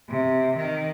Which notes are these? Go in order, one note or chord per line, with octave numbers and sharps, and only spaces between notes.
C3
D#3